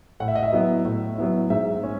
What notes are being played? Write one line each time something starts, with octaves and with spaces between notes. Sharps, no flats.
A2 F#5
E5
D#5
E5
F#3 B3 E4
A2
F#3 B3 E4
G#2 E5
G#3 C#4